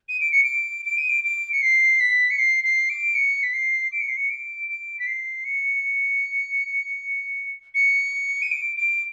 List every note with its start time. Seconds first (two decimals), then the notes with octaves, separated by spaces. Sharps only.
0.09 D#7
0.21 D7
0.32 C#7
0.44 D7
0.85 D7
0.97 D#7
1.09 D7
1.24 D7
1.53 C#7
1.62 C7
2.00 B6
2.31 C#7
2.39 C7
2.64 C7
2.90 D7
3.15 C#7
3.43 B6
3.53 C7
3.92 D7
4.00 C#7
4.09 C7
4.17 C#7
4.30 D7
4.68 D7
4.99 B6
5.07 C7
5.45 C#7
7.75 C#7
8.42 D#7
8.51 D7
8.77 D7